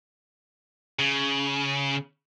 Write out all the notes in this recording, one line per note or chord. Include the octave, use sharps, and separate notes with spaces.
C#3